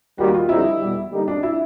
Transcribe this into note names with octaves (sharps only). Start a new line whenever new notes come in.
D#2 D#3 G3 A#3 F#4
F4
F2 D3 G3 C4 D#4 E4
E2 B2 G3
D3 G3 A#3 D#4
D4
E4